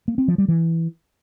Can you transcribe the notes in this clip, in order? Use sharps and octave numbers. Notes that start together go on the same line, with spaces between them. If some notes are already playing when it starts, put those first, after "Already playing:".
A#3
C4
F3
G3
E3